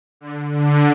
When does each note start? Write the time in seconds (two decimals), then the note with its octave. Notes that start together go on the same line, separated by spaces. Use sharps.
0.21 D3
0.52 D3